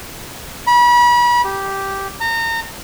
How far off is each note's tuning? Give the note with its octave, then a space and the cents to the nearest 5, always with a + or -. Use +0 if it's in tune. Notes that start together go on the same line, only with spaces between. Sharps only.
B5 -35
G4 -5
A#5 -30